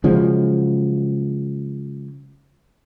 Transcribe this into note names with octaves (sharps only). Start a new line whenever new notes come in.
C#3 F3 F#3 G#3